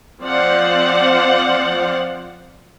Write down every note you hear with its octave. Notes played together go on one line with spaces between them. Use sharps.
F3 C4 C5 D5 F5 F#5